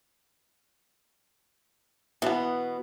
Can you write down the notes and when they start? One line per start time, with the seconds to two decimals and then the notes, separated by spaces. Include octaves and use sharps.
2.22 B2 E3 B3